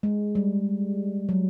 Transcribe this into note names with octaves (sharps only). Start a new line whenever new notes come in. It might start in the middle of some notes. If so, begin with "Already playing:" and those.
G#3
G3
F#3